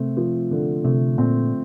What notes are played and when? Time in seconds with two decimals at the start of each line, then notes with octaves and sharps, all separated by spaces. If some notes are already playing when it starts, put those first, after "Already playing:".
Already playing: C3 A3 C4
0.17 F3
0.51 D3
0.84 C3 A3
1.18 A#2 C4